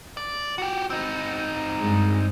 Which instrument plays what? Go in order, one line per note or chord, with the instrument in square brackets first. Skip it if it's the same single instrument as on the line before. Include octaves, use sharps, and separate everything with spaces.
[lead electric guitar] D5
F#4 G4
C4 D#4
[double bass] G2 G#3